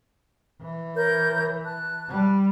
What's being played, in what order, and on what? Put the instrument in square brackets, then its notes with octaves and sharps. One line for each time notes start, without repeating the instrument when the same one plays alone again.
[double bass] E3
[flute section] A#4 C#5 G6
A5 F#6
[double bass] G3